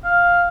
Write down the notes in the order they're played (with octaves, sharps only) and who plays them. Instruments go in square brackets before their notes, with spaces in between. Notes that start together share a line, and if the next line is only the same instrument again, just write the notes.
[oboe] F5